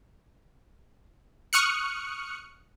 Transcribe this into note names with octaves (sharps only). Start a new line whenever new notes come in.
C#6 D#6 F6 F#6 C#7